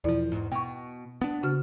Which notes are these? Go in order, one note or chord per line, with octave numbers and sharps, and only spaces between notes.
E2 B2 F3 E4 D5
E2 G#2
B2 G5 C#6
B3 D4
C#3 F#4 F6